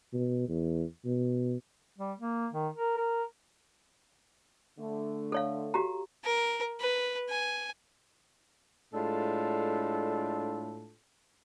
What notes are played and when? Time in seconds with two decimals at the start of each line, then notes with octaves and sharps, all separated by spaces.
0.13 B2
0.48 E2
1.05 B2
1.98 G3
2.19 A#3
2.53 D#3
2.76 A#4
2.97 A#4
4.78 D3 A3
5.32 A4 C#5 F5
5.74 F#4 G4 A#5
6.24 A#4
6.80 B4
7.30 G#5
8.94 A2 G#3 D4 F4 A4